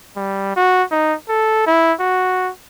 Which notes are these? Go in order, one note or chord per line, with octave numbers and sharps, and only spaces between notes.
G3
F#4
D#4
A4
E4
F#4